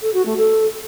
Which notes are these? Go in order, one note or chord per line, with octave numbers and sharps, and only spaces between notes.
A4
F#4
A3
A4